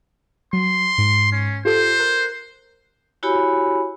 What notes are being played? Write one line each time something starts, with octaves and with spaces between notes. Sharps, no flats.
F#3 C6
G#2
C#4
F4 G4 A4 C5
A#4 F#6
E4 F#4 G4 C#5 G#5 B5